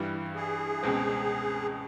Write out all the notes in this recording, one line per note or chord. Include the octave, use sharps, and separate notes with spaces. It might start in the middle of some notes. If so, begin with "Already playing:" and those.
Already playing: G2 E3 G3
G#4
C#2 B2 G#3 C4